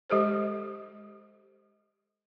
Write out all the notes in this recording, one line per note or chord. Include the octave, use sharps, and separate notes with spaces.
G#3 G4 A4 C5